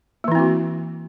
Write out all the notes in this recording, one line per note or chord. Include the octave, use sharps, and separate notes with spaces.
E3 A#3 C4 E4 F#4